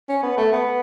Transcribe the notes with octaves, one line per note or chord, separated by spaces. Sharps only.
C#4
B3
A3
B3